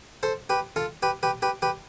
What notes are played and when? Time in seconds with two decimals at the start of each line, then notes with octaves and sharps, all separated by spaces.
0.23 A4 C5
0.50 G4 B4
0.76 F4 A4
1.03 G4 B4
1.23 G4 B4
1.42 G4 B4
1.62 G4 B4